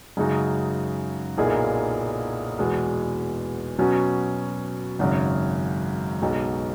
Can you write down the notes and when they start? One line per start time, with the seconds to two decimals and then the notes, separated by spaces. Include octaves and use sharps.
0.17 F#2 C#3 G#3 D#4 F#4
1.37 B1 A#2 A#3 E4 G#4
2.59 E2 B2 G#3
3.78 B2 F#3 C#4
4.99 G#1 F#2 C#3
6.21 B1 B2 G#3